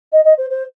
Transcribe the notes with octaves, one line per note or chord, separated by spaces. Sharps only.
D#5
D#5
C5
C5